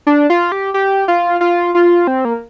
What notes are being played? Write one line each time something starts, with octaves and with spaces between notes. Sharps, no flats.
D4
F4
G4
G4
F4
F4
F4
C4
A#3